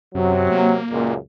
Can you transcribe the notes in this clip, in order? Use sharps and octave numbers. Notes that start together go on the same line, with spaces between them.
F#2 C3 F#3
A#3
C#2 F#2 A#2